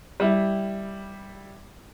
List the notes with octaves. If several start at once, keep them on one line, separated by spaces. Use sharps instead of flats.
G3 E4